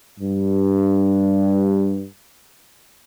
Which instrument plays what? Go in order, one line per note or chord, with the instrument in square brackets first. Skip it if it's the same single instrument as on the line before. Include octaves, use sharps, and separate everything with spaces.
[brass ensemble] G2